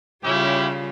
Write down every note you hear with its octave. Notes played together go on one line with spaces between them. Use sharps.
C#3 G3 C#4 E4 F4 G4